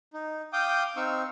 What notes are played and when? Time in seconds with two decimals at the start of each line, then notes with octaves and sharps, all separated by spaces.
0.14 D#4
0.53 F5 G5 D6 D#6 G6
0.96 C4 D#4 F5 C#6 E6